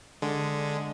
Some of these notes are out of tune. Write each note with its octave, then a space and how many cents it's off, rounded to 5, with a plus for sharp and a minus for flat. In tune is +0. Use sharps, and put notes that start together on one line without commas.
D3 +0 G#3 +0